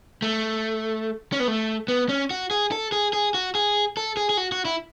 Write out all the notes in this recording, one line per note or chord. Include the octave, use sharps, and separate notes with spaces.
A3
C#4
B3
A3
B3
C#4
F#4
G#4
A4
G#4
G#4
F#4
G#4
A4
G#4
G#4
F#4
F#4
E4